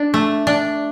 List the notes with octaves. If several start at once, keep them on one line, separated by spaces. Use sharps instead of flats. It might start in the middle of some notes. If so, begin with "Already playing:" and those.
Already playing: D4
A3
D4